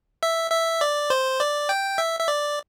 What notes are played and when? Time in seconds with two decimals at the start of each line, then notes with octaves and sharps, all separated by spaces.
0.23 E5
0.51 E5
0.81 D5
1.10 C5
1.40 D5
1.69 G5
1.98 E5
2.20 E5
2.28 D5